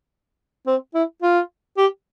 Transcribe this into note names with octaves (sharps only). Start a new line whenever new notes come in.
C4
E4
F4
G4